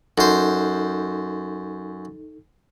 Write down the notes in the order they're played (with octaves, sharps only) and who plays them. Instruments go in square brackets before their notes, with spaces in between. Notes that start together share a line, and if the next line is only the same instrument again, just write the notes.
[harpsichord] F#2 C5 [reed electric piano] D#4 A4